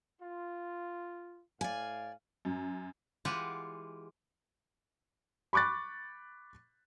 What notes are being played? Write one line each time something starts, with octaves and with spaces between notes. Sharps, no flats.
F4
A2 D5 F5 G#5
F#2
E3 G#3 F4 G4 F#5
B5 C#6 D6 F#6 A6